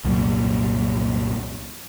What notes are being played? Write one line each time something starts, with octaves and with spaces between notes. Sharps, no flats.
C2 F#2 A#2